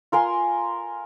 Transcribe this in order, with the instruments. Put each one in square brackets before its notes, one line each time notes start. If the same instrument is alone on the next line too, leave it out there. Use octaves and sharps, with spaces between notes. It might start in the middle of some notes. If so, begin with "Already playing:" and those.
[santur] F4 A#4 G#5 C6